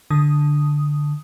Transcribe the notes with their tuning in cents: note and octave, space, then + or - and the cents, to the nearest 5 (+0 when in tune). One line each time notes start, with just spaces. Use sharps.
D3 +0 D#6 +0